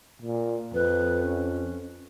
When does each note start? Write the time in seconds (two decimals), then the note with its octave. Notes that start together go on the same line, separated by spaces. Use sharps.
0.22 A#2
0.74 F2 B4
1.24 C#4